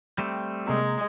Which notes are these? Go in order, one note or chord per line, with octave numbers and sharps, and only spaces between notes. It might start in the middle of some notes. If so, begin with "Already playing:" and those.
G3 A3 C4
C3 G#3 A#3 A#5